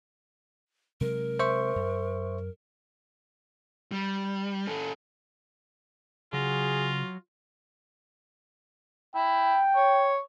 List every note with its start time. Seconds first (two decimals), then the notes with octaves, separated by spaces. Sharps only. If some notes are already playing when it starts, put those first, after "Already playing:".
1.01 C3 F#3 G#3 A#4
1.39 C5 E5 C#6
1.76 F#2
3.92 G3
4.67 C#4 A4
6.33 C#3 F#3 F4 F#4 G#4
9.16 E4 G5
9.76 C#5